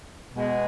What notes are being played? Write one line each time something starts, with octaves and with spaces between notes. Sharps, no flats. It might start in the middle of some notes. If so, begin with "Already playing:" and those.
B2 G#3